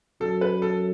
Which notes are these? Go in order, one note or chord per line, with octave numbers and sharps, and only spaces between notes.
F#2 A4
B4
A4